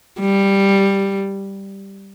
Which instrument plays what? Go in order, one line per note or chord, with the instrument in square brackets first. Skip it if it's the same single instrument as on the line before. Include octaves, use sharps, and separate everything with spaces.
[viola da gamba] G3